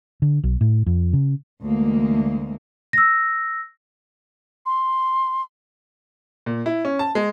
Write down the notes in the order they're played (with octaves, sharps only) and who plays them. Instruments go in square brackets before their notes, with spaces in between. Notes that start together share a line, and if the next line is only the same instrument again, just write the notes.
[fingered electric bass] D3
B1
A2
F2
C#3
[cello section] D2 E3 G#3 A#3
[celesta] E6 A#6
[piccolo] C6
[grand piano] A#2
E4
C#4
A5
G#3